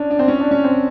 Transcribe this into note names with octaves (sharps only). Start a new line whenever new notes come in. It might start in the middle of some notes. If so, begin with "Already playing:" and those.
Already playing: C#4 D4
D4
C4
C#4
D4
C#4
C4